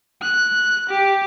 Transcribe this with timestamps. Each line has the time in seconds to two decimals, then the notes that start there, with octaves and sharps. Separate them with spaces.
0.21 F#6
0.90 G4